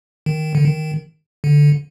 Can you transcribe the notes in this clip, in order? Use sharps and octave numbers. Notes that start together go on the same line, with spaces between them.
D#3
D3
D#3
D3